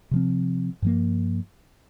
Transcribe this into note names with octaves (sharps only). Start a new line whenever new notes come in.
C3 F3 C4
G2 F3 A#3